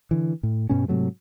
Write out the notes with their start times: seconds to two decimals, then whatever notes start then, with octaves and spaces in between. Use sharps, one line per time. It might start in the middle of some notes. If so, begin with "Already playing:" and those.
0.11 D3 E3
0.43 A2
0.69 G2 B2 G3 C#4
0.88 G#2 C3 F#3 A3